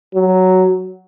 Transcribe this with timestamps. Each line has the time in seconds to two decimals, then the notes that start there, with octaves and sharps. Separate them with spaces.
0.15 F#3